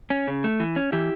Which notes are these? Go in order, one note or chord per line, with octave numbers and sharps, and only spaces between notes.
C#4
C#3
A3
E3
C#4
E3 E4 G4